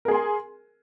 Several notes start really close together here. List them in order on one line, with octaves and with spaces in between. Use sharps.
A#4 G#4 C6 G#5